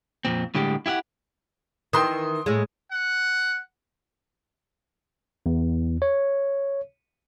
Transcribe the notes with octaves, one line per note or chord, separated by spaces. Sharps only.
F2 A#2 C4
A2 D3 G3 G#3 G4
E4 G4 E5 F#5
D#3 E3 G5 C6 D#6
A2 G#3
F#5
E2
C#5